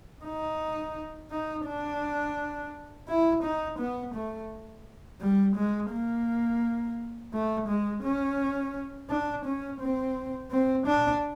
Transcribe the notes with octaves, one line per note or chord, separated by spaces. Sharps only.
D#4
D#4
D4
E4
D#4
B3
A3
G3
G#3
A#3
A3
G#3
C#4
D4
C#4
C4
C4
D4